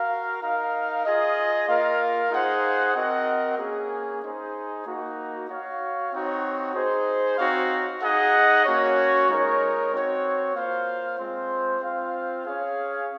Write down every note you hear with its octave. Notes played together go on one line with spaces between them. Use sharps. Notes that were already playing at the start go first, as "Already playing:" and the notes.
Already playing: F#4 A#4 F5
D#4 A#4 F5
F4 G#4 D#5
A#3 F4 A#4 F5
D#4 G#4 C5 F#5
C4 F#4 A#4 D#5 F#5
A#3 C#4 G#4
D#4 G#4 C5
A#3 D#4 F#4
F#4 C#5 F5
C4 D#4 F#4 C#5
D#4 G#4 C5
C4 D#4 F#4 C#5 F5
D#4 G#4 D#5 F#5
A#3 C#4 F#4 C#5
G#3 D#4 A#4 C#5
C4 F#4 C#5
A#3 F4 C5 F5
G#3 C4 F4 C5
C4 F4 C5 F5
C#4 G#4 C#5 F5